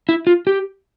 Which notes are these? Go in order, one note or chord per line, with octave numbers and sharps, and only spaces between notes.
E4
F4
G4